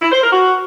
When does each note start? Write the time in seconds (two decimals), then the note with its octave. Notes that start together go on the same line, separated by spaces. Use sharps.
0.02 E4
0.12 C5
0.22 A#4
0.32 F#4